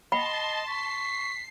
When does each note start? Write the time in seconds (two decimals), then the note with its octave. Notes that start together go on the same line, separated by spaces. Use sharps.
0.12 D#5 F#5 G5 A5 B5 C6 G7
0.67 C#6 B6 C7